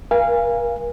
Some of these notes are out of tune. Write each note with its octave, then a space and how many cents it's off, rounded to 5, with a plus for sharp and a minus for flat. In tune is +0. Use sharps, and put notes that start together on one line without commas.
A#4 +45 F5 -25 G#5 -20